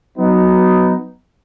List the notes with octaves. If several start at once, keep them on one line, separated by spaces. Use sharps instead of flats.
F#3 B3 D#4